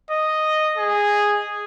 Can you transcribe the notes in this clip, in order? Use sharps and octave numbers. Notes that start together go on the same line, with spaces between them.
D#5
G#4